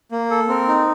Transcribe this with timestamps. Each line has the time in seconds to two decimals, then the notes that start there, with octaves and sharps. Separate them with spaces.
0.12 A#3
0.31 A4
0.48 C4 A#4
0.68 D#4